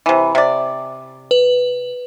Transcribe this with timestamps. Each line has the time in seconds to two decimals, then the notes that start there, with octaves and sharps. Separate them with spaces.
0.06 C3 E3
0.35 C3 D5
1.31 B4